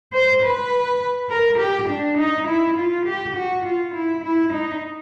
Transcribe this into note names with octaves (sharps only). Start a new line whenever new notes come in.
C5
B4
A#4
G4
D4
D#4
E4
F4
G4
F#4
F4
E4
E4
D#4